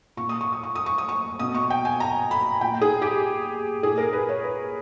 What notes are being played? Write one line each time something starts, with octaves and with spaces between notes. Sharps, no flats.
A#2 C#6
D#6
C#6
D#6
C#6
D#6
C#6
D#6
C#6
B2 D#6
C#6
G5
G#5
A#5
B5
A#2 G5
G#4
G4
A#2 G#4
A#4
B4
C#5
B4